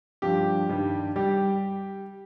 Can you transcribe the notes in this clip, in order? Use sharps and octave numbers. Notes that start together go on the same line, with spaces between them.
G2 F3 G4
G2 D#3 G3
G3 G4